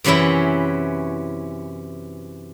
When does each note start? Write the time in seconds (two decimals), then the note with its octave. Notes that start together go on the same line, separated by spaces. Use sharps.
0.04 F#2 C3 E3 C#4 E4